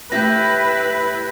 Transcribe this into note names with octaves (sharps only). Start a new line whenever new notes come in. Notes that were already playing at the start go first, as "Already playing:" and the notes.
A2 E4 G4 B4 E5 G6 A#6